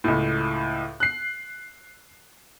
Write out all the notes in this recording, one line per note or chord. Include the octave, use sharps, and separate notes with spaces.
C#2 A2
F#6 C7